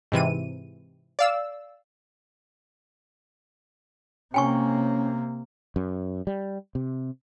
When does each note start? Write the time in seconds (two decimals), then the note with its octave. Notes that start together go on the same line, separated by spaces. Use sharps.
0.12 G#2 C3 E3 D#7
1.19 D5 F5 E6
4.34 C3 A#3 C#4 G5 G#5 C#6
5.76 F#2
6.27 G3
6.75 C3